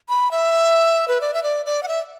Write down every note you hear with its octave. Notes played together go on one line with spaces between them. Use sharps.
B5
E5
B4
D5
E5
D5
D5
F#5
E5